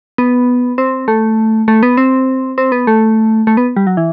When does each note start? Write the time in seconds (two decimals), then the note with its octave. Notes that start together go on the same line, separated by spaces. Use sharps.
0.18 B3
0.78 C4
1.08 A3
1.68 A3
1.83 B3
1.97 C4
2.58 C4
2.72 B3
2.87 A3
3.47 A3
3.57 B3
3.76 G3
3.87 F#3
3.97 E3